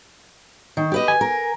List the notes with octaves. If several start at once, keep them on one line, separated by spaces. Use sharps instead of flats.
D#3
G4 B4 D#5
G#5
A#4